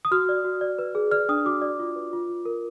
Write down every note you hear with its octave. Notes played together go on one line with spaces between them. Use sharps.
D#6
F#4 F6
D5
F#4
D5
B4
G#4
D5 F6
D4 D#6
F#4 D6
D5
F4
B4
F4
F4
A#4